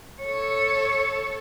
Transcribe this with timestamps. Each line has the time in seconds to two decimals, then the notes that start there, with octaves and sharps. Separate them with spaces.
0.22 A4 C#5